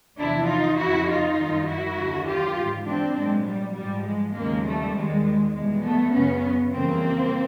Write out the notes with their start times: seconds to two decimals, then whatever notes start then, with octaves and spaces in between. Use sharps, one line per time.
0.18 E2 C3 F3 D4 E4
0.48 D#4 F4
0.77 F2 C#3 F3 E4 F#4
1.07 D#4 F4
1.37 F#2 D#3 G3
1.67 E4 F#4
1.97 D#2 D3 F#3
2.26 F4 G4
2.56 G#2 E3 G3
2.86 C4 D4
3.16 A#2 F#3 G#3
3.46 G3
3.75 G#2 F3 G3
4.05 G#3
4.34 D#2 C#3 F3 G#3 A#3
4.65 G3 A3
4.94 D#2 D#3 G3 G#3
5.54 E2 B2 G3 G#3
5.84 A3 B3
6.13 F#2 C#3 F#3 B3 C#4
6.73 F2 C#3 E3 G3 A#3 C4